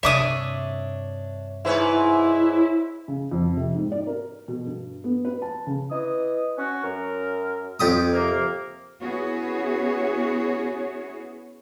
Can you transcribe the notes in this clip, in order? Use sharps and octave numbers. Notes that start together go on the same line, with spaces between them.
G2 C3 D4 C#5 E5 D6 D#6
G#2 E4 B4 C#5
C#3
F2
C3
G#2
D5
A#4
B2
G2
B3
B4
A5
C#3
E3 D#5 D#6
C#4 F#4
F#2 A#4
F2 G4 D#6
C3 A#3
B3 C#4 E4 F#4 G#4 C#5